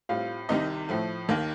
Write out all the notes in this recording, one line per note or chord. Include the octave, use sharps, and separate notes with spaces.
A2 G3 C4 F4 F5
C2 C3 D#3 D#4 D#5
A2 F3 A3
D#2 D#3 A#3